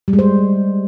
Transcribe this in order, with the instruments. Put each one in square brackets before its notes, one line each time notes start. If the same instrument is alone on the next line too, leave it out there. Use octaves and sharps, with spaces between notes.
[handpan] G3
G#3
C5